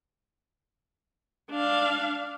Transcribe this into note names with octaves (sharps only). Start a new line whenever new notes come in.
D4 F5